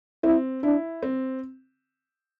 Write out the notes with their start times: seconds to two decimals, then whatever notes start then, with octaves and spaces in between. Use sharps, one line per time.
0.24 C4 E4
0.63 D4 E4
1.03 C4